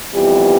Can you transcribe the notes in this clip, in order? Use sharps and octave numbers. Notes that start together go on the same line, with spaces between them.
F2 E3 G3 B3 G4